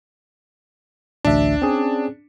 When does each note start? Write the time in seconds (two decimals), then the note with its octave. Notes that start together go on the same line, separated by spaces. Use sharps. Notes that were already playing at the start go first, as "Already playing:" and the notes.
1.25 A1 D2 D4 E5
1.62 C4 C#4 G#4